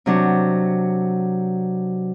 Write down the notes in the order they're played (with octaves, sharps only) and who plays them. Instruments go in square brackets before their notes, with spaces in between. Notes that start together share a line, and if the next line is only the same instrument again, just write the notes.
[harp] C3 F#3 D4